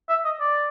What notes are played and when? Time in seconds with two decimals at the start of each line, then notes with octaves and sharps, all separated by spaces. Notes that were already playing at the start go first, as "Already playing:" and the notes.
0.09 E5
0.25 D#5
0.40 D5